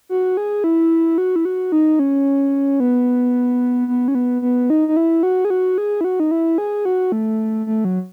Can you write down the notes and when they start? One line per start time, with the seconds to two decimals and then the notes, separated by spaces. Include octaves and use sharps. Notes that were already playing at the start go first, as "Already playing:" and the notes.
0.09 F#4
0.37 G#4
0.64 E4
1.18 F#4
1.36 E4
1.45 F#4
1.72 D#4
1.99 C#4
2.80 B3
3.88 B3
4.08 C#4
4.15 B3
4.42 B3
4.70 D#4
4.88 D#4
4.97 E4
5.23 F#4
5.45 G#4
5.50 F#4
5.78 G#4
6.01 E4
6.04 F#4
6.20 D#4
6.31 E4
6.58 G#4
6.85 F#4
7.12 A3
7.67 A3
7.85 F#3